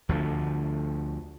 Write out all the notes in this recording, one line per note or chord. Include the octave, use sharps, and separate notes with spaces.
D2 D3 F3